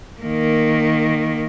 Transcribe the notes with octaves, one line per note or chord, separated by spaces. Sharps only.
D#3 A#3